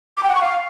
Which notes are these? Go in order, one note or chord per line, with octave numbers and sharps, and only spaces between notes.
D6
G5
F#5
C#6
F5